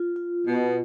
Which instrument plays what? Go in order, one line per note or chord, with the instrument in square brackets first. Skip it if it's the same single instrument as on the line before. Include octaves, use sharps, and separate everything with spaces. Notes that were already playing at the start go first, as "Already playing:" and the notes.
Already playing: [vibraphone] F4
F4
[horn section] B2 [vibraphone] F4